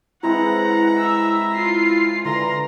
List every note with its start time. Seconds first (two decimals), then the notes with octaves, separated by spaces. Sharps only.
0.23 E3 G#3 C4 E4 F#5 A#5
0.99 E5 E6
1.55 F4 C7
2.25 D3 E3 A#4 A#5 C6